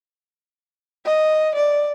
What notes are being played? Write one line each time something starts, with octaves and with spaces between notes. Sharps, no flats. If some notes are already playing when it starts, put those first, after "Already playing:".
D#5
D5